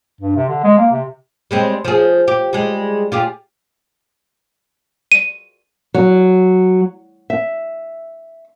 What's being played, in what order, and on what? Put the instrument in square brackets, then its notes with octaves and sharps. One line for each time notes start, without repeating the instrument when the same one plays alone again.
[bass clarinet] G2
C3
D3
G#3
A#3
C3
[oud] G3 G#3 C4
F3 G#4
G4
G3 G#3
F4 G4 G#4
[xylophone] D#7
[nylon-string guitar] F#3
E5